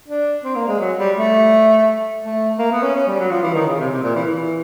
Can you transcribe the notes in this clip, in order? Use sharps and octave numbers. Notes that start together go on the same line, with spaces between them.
D4
C4
A#3
G#3
F#3
G3
A3
A3
A#3
B3
C#4
C#4
G3
F#3
F3
E3
D#3
C#3
C3
C3
A#2
E3
E3